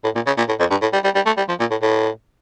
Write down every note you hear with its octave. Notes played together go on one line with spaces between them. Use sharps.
A2
A#2
C#3
A#2
A2
F2
G2
A2
G3
G3
G3
A3
G3
F3
A#2
A2
A2